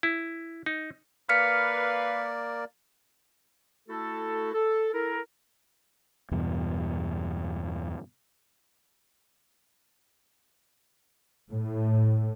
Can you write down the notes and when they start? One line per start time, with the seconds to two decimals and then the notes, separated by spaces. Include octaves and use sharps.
0.03 E4
0.66 D#4
1.29 A#3 A#4 B4 D5 F5 F6 B6 C#7
3.89 A3 E4 F#4 A4
4.54 A4
4.93 E4 A4 A#4
6.31 E2 G2 B2
11.52 A2